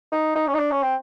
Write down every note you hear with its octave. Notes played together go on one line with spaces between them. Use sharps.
D#4
D#4
C#4
D#4
D4
C#4
C4